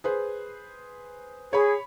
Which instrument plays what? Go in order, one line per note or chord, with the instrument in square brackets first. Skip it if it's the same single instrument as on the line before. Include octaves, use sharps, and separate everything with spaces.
[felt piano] G#4 B4 C5
[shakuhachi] G#4 [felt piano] C#5 B5